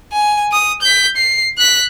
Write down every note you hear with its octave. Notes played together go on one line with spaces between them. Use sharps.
G#5
D#6
G6 B6
C7
F#6 B6